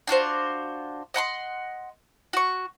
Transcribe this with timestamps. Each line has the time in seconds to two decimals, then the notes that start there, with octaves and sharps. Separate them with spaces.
0.07 D4 F4 F#4 C5
1.14 D#5 F#5 B5 C6
2.33 F#4 C#6